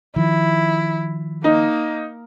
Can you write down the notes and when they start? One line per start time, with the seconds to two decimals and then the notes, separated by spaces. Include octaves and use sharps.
0.16 D#3 F3 E4
1.44 A#3 D#4